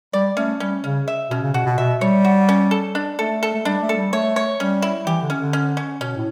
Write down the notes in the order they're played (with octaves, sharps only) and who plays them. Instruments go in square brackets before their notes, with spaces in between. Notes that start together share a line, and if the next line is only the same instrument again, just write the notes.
[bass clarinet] G3 [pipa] D5
[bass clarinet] A3 [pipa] C#4
[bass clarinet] G3 [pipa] C#4
[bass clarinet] C#3 [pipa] C#4
[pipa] E5
[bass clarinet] B2 [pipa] C#4
[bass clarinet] C#3
[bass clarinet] B2 [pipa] F#4
[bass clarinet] B2
[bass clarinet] B2 [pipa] E5
[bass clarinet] G3 [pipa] C#5
[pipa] F#4
C#4
A4
D4
[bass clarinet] A3 [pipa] A4
[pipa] A4
[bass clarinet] A3
[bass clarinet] G3 [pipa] D4
[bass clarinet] A3
[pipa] A4
[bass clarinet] G3
[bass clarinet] A3 [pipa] C#5
[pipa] C#5
[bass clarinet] G3 [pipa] C#4
[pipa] E4
[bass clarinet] E3 [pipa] G4
[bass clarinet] D3
[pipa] C#4
[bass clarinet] D3
[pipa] C#4
C#4
[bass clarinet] B2 [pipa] C#4
[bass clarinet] A2